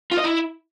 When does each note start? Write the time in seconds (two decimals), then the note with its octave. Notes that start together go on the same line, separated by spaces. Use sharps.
0.11 F4
0.18 D#5
0.24 E4